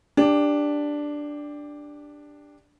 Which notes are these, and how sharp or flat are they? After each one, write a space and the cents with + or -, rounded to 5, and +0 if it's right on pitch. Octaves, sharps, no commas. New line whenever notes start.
D4 +0 G4 +20